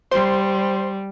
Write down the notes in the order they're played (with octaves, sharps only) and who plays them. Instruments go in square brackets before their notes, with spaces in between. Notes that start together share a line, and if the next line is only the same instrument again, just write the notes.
[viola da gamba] G3 [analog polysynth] C5 C6